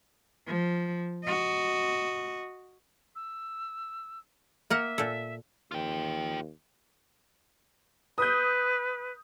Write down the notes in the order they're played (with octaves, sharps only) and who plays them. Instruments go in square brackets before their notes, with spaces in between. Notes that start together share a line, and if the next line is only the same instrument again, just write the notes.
[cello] F3
F#4 D#5
[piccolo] E6
[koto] A#3 A#4 F#5 [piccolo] E5
[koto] A#2 A4
[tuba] D#2 [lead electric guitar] F4 G5
[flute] B4 [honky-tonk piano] D#6 G6